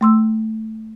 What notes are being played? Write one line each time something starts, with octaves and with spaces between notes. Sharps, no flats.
A3 C6 E6